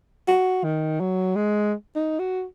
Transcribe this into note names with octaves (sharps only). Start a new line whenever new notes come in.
F#4
D#3
F#3
G#3
D#4
F#4